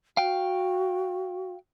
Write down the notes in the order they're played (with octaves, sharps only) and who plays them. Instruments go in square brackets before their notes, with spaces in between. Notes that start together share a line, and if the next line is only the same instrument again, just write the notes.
[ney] F#4 [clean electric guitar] F5 G5